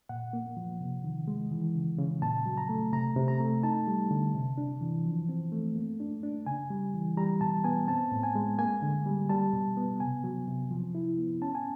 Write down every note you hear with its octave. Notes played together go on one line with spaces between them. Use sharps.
A#2 F#5
A#3
F3
C3
D#3
G#3
E3
C#3
C#3
A#2 A5
F#3
A#5
A3
C3 A#5
C3
A#5
A3
D#4 A5
G3
D3
C3
D4
E3
F3
C4
A3
A#3
D4
D4
C#3 G#5
G3
E3
G3 A#5
B2 A5
B3 G#5
C4 A5
A2
G#5
G#3
A#3 G#5
D3
G3
G3 A5
B2
B3
C3 G#5
F#3
C3
F3
E4
B3
C#4 A5
G#5